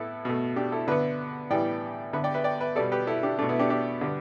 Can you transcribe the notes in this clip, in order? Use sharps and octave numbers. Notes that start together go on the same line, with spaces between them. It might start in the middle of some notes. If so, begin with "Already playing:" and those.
Already playing: A2 B3 E4 A4 B4
B2 A3
D4 G4
E4 A4
D3 B3 B4 E5
A2 E3 G3 B3 D5 G5
D3 B3 B4 E5
D5 G5
B4 E5
D5 G5
B4 E5
B2 G3 B3 A4 D5
G4 B4
E4 A4
D4 G4
B2 A3 D4
B3 E4
D4 G4
D4 G4
D3 G3 B3